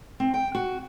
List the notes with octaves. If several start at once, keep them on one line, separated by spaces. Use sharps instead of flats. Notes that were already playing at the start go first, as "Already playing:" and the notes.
C4
G5
F#4